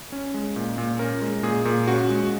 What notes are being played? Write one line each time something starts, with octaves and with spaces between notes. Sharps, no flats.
C#4
G#3
A#2
A#2
C#4 A#4
G#3
A#2 G#4
A#2
C#4 F#4
G#3